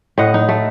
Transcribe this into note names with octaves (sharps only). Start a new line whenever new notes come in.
A2 D#5 F#5
D#4
A3